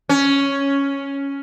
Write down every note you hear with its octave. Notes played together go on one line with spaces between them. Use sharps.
C#4